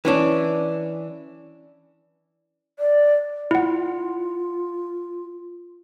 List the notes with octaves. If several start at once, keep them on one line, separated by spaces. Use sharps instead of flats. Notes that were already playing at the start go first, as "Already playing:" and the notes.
E3 C#4 D4
D5
E4 F4 F#5